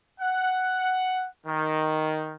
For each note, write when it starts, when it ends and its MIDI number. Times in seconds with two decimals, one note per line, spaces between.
0.21 1.27 78
1.46 2.34 51